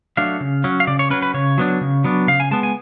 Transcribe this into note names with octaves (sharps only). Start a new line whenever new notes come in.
F#3 A3 D4 F5
C#3
F#3 C#4
F5
C#3 D5
C#5
F#3 C#4 B4
B4
C#3 C#5
F#3 B3 D4
C#3
F#3 B3 D4
C#3 F5
G#5
G#3 B3 A5
G#5